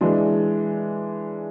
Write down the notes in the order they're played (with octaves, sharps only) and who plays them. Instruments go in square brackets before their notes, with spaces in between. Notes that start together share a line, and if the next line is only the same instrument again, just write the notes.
[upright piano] E3 G#3 D4